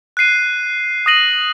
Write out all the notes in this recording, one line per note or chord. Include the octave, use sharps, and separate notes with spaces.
F#6 C7 D#7
D#6 A#6 D#7 F#7